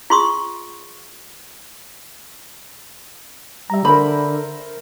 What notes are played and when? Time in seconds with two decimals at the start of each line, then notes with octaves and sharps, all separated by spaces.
0.10 F4 G#4 C6 C#6 D#6
3.70 G3 E5 A#5
3.85 D3 A#4 C5 B5